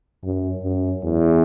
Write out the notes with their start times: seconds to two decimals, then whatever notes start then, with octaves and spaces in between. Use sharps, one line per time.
0.24 F#2
0.63 F#2
1.04 E2